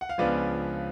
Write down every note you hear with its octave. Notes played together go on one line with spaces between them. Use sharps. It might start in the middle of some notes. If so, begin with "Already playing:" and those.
F#5
F5
C#2 C#3 F3 B3 D4 B4 D5